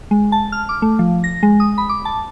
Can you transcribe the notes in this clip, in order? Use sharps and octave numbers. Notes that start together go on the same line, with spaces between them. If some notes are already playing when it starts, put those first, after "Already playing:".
G#3
A5
F6
D6
A3
F3
A#6
G#3
D#6
B5
D6
A5